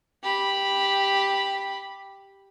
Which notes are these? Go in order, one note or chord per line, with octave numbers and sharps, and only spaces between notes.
G4 B5